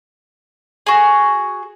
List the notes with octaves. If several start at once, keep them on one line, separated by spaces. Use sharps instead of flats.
F#4 G#4